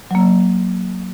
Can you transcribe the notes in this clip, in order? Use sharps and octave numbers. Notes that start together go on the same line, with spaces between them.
F#3 A#3